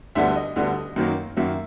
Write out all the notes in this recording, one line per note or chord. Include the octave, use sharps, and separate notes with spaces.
D2 D3 G3 B3 E5
D#5
D2 D3 G3 B3
F#2 D#3 F#3 A#3
F#2 D#3 F#3 A#3 E5